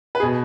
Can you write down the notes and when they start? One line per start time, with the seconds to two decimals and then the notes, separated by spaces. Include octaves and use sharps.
0.15 B4
0.20 G#4
0.23 B2